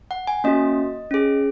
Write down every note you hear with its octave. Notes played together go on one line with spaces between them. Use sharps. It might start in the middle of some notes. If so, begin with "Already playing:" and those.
F#5
G#5
A#3 C#4 F#4 D#5
C#4 G#4